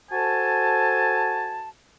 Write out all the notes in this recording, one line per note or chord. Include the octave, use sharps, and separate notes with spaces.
F#4 A4 C5 G#5 A5